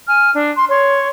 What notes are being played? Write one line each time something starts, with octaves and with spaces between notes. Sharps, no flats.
G#5 F6
D4
C6
C#5 C6